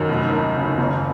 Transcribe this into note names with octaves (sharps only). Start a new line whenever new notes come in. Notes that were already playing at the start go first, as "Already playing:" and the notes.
Already playing: F#2 D#3
F1
D#2
C#3
F#1